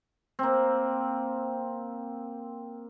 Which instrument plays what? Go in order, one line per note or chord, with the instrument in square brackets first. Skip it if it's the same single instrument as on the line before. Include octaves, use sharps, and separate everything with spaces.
[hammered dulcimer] A#3 C4